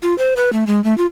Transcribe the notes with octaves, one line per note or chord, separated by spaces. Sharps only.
F4
C5
B4
A3
G#3
A3
F4